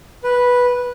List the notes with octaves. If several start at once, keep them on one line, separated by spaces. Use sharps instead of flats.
B4